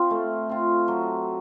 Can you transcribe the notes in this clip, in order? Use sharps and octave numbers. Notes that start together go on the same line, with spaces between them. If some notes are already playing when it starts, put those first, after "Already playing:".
Already playing: C4 F4
A3
C4 F4
F#3